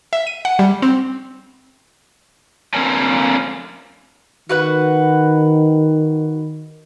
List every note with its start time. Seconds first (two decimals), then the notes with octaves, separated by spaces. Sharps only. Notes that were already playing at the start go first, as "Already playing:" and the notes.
0.13 E5
0.27 D#7
0.45 F#5
0.59 G3
0.82 C4
2.74 F2 D3 A#3 C#4 G#5
4.49 D#3 F#4 B4 F#5